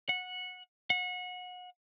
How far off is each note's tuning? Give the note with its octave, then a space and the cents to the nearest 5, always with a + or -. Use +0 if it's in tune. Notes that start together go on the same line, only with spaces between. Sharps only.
F#5 -15
F#5 -30